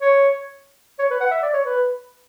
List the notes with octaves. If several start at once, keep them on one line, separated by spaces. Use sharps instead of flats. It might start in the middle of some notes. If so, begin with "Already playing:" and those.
C#5
C#5
B4
F#5
E5
D5
C#5
B4